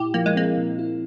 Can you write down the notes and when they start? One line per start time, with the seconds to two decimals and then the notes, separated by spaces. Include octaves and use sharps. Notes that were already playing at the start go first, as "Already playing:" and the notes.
Already playing: A#2 E4 G4
0.14 F3 A#3
0.26 G#3
0.36 A#3 C4
0.57 A#2
0.79 E4